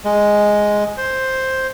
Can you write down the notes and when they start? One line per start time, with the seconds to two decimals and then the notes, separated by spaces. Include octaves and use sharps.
0.05 G#3
0.97 C5